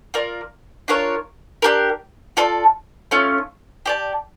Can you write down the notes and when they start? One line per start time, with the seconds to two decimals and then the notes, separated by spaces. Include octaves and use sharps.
0.14 F4 A#4 D5
0.88 D4 F4 A#4 C#5
1.62 D4 G4 A#4
2.37 F4 A4 D5 A5
3.11 A3 C#4 F4
3.86 G4 D5 A5